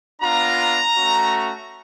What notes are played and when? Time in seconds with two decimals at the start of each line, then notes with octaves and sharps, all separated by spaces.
0.22 B3 D4 F4 A#5
0.95 A3 C#4 F#4